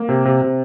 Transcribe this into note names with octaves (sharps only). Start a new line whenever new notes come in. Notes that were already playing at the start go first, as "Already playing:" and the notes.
Already playing: A#3
C3
C3
C3